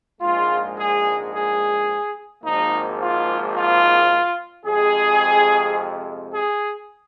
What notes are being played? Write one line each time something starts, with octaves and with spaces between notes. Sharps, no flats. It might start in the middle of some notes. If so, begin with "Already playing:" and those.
A#1 G#2 G#3 F4
G#4
G#4
G#1 G#2 F3 A#3 D#4
F4
F4
F2 C3 G#3 G#4
G#4